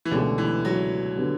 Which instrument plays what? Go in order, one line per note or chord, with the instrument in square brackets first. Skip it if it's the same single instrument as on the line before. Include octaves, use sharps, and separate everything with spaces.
[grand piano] E3
[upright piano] C#2 B2 A3 C#4 G4 [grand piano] D3
[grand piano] E3
F#3
[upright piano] D3 G3 B3